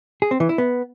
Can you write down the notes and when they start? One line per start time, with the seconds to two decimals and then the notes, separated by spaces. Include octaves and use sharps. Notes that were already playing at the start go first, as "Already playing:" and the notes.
0.22 G#4
0.31 C4
0.40 E3
0.49 E4
0.58 B3